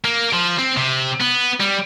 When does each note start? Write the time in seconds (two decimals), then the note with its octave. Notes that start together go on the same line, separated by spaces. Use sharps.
0.05 A#3
0.33 F3
0.59 C4
0.77 C3
1.21 B3
1.61 G3